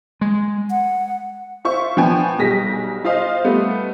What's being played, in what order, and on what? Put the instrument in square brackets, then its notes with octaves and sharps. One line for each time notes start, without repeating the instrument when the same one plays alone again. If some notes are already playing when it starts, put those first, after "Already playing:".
[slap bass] G#3
[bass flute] F#5
[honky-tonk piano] F4 C5 E5 C#6
F3 B3 D4 G5 G#5 C#6
B1 G3 G#4 A#6 B6
F4 C5 D#5 F5
G3 A3 B3